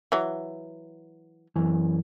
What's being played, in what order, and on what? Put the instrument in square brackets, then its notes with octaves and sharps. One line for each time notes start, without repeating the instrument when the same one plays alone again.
[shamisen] E3 F#3
[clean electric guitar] F#2 E3